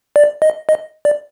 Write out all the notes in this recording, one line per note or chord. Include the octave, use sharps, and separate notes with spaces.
D5
D#5
D#5
D5